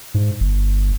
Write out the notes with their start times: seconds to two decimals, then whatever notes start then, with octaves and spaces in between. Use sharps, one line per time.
0.14 G#2
0.41 G1